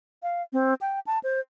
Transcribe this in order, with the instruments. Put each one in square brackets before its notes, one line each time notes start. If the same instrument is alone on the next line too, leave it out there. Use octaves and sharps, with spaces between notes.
[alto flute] F5
C4
G5
A5
C5